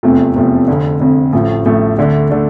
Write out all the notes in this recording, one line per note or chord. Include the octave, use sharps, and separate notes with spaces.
F1 E2 C3 F3 A3
F1 E2 C3 F3 A3
F1 F2 D3
F1 F2 D3
A1 A2 F3 A3
A1 A2 F3 A3
D2 D3 A3 D4
D3 A3 D4